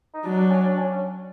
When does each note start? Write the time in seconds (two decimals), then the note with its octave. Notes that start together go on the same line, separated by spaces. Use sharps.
0.14 D#4
0.25 F#3 D4
0.39 D4
0.52 C#4
0.65 D4
0.79 C#4